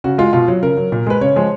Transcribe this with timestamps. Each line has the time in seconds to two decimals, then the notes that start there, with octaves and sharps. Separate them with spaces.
0.04 C#3 F#4
0.18 G#3 F4
0.33 B2 F4
0.48 F#3
0.62 C#3 A#4
0.77 F#3
0.92 A#2
1.06 G#3 B4
1.21 C#3 C#5
1.36 F3 G#3